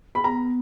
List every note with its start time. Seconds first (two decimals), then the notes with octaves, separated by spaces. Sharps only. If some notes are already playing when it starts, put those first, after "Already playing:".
0.15 B5
0.24 B3 A#5